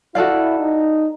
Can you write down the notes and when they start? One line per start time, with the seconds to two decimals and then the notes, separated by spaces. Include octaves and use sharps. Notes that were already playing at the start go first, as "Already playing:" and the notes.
0.15 E4 F#4 A4 D5 F5
0.59 D#4